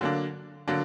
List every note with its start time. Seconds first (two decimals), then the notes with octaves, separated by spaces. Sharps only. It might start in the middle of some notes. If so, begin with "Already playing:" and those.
0.01 D3 F#3 A#3 D4
0.68 D3 F#3 A#3 D4